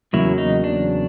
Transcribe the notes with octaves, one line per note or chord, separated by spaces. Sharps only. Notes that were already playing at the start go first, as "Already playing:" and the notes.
E2 C#3 F#3 A#3 E4
D#4
D4